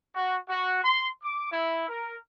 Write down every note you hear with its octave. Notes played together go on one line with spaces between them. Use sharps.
F#4
F#4
C6
D6
E4
A#4